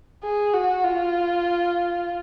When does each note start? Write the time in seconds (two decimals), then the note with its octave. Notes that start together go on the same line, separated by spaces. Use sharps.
0.24 G#4
0.54 F#4
0.84 F4